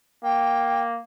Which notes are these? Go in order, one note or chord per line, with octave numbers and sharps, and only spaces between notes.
A#3 G5